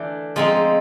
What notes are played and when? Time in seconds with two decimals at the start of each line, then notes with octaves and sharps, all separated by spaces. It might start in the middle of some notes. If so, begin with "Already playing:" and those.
Already playing: E3 A3 D4
0.36 F3 G#3 C4 D#4